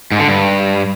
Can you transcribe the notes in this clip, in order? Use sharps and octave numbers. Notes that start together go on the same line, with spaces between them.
G#2
D3
G2